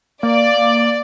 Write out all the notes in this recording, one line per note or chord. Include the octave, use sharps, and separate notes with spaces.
A#3 D5